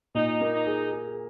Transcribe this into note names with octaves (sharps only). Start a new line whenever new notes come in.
A#2 D#4
A#3
D#4
G#4
G#4